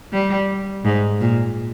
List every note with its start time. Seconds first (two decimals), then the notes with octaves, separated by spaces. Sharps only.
0.13 G3
0.85 G#2
1.21 A#2